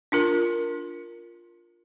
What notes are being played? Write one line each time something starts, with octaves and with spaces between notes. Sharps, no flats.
D4 F4 A#4